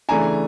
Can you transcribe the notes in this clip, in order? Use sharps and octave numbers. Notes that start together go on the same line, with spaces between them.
C#3 E3 A3 D4 G#5 A#5